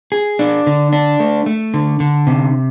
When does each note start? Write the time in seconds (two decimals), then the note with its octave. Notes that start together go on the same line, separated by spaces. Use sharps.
0.12 G#4
0.39 D4
0.67 D3
0.92 D4
1.20 A3
1.46 A3
1.74 D3
2.00 D3
2.27 C3